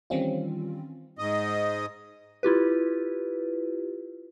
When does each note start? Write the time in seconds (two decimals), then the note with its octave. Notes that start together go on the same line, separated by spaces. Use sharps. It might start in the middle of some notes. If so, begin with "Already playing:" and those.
0.10 D#3 E3 G3 C4 C#4 F4
1.18 G#2 D#5
2.43 E4 F4 G4 B4